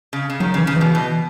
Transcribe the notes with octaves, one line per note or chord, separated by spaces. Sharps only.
C#3
C#3
D#3 F#3
C#3
E3
C#3
B2 E3
B2